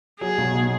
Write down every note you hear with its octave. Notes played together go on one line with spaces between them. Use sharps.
F#3 G#4
B1
B2